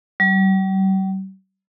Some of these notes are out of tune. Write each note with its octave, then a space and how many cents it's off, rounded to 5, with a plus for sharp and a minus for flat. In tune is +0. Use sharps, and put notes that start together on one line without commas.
G3 -40